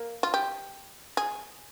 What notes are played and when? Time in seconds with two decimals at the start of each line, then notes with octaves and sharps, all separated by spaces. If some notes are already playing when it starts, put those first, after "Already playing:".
Already playing: A#3
0.23 F4
0.34 G4
1.17 G#4